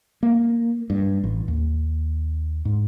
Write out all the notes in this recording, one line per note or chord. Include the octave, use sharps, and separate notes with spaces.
A#3
G2
A1
D#2
G#2